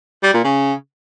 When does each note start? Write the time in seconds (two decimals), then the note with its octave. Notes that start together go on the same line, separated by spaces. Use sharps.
0.23 G3
0.34 A#2
0.44 C#3